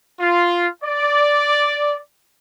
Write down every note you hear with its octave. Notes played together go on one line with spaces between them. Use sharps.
F4
D5